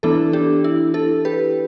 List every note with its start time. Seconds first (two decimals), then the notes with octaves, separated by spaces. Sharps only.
0.03 E3 B3 D4 E4 A4
0.33 D4 G4
0.64 E4
0.94 E4 A4
1.25 G4 B4